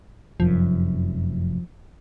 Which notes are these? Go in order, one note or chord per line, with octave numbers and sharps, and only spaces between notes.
F1 F#2 F3